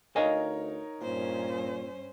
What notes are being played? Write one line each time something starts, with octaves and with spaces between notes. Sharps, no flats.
D2 D#4 A#4 C#5 D#5 F5 G#5
G2 A#2 C#4 C5